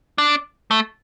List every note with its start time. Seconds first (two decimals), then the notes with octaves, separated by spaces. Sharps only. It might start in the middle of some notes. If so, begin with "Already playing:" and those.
0.18 D4
0.71 A3